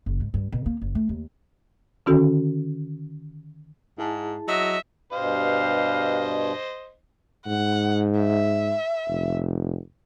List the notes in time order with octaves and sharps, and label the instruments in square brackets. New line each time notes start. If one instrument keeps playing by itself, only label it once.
[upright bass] F#1
G#2
G2
B2
A#3
F#1
A3
D#2
[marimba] D3 D#3 C#4 F#4 A4
[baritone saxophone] G#2 [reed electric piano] E4 G#4 A5
[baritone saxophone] F#3 [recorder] D#5 [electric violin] E5
[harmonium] G2 B2 [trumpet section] G4 B4 F5 [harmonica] C5 D#5
[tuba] G#2 [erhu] F#5
[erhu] E5
[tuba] F1